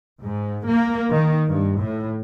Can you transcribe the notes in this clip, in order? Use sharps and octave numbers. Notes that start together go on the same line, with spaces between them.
G#2
A#3
D#3
G2
A2